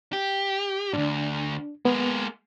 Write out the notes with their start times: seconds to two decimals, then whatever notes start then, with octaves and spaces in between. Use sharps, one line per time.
0.13 G4
0.93 D2 G#2 D4
1.85 G#3 A#3 B3